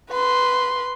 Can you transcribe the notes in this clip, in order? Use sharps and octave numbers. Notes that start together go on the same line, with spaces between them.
B4 C6